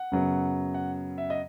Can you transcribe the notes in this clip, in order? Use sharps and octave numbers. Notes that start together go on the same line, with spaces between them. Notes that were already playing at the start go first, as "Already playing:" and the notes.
Already playing: F#5
F#2 C#3 F#3 B3
F#5
E5
D#5